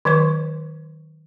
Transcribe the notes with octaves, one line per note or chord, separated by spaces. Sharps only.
D#3 F#3 C5 C#6